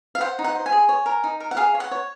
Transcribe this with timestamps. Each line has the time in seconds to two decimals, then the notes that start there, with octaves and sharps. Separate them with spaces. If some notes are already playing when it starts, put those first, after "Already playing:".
0.15 F5
0.21 C5 F#5
0.39 D#4
0.44 F#5
0.55 C5
0.66 G#5
0.72 G#4
0.89 C#5
1.06 A#4
1.24 D#4
1.40 A#4
1.51 F#5
1.57 G#4 F5
1.74 C#5
1.80 F#5
1.91 C#5